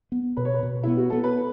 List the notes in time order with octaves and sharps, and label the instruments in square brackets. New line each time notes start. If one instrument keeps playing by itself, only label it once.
[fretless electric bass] B3
[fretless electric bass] B2 [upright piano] B4
[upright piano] C#5
B4
[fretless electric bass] B2
[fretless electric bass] B3 [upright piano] E4
[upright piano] F#4
[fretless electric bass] B3 [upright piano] A4
[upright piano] B4